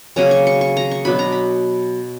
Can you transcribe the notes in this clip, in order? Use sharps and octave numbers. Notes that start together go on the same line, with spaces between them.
C#3 F#3 A#3 C#4 A#5
C#6
C#6
C#6
A#5
C#6
B2 F#3 B3 D4 B5
A#5
B5